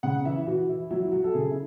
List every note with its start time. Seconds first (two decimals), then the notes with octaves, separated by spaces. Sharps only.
0.03 C#3 F#5
0.25 E3 E5
0.47 E3 F#4
0.69 E3 E4
0.91 F#3 E4
1.12 F#3 F#4
1.24 A4
1.34 C#3 G#4
1.51 E4